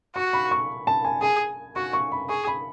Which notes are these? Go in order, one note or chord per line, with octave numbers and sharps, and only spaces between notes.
F#4 C#6
B5
C#6
A5
G#5
G#4 G#5
F#4 C#6
C#6
B5
G#4 C#6
B5